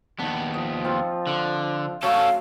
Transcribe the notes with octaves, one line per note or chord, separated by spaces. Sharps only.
D#2 B3 D4
F3 D#5
C4 F4
D3
F#3 A3 C#4 A4 F5